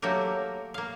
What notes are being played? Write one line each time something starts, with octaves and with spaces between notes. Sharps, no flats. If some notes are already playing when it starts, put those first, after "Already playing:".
F#3 A3 A#3 G4 A#4
A#3 F5